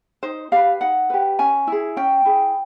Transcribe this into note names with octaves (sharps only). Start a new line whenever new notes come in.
D#4 C5
G4 B4 F5
D#4 F#5
G4 B4
C#4 G#5
E4 G#4
C#4 G5
E4 G#4